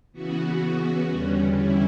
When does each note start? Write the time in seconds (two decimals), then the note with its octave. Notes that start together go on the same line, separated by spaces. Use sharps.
0.12 C#3 E3 B3 F#4
1.07 E2 D3 G3 C#4
1.55 E4